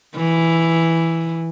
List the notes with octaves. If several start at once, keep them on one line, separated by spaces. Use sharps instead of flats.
E3